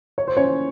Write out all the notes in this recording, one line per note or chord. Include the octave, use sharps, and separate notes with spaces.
C#5
C5
C#4 C#5